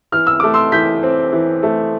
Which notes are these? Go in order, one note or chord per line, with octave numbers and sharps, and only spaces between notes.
E3 F6
E6
A3 D6
C6 E6
E3 G6 B6
C4
E3
A3